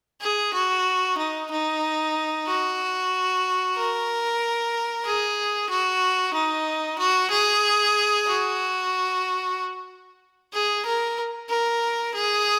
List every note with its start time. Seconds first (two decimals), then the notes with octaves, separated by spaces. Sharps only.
0.21 G#4
0.54 F#4
1.18 D#4
1.51 D#4
2.47 F#4
3.76 A#4
5.05 G#4
5.70 F#4
6.34 D#4
6.99 F#4
7.31 G#4
8.27 F#4
10.53 G#4
10.86 A#4
11.50 A#4
12.15 G#4